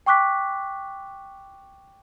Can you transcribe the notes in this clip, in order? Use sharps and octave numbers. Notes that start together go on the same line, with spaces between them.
G5 C#6 D6 F#6 B6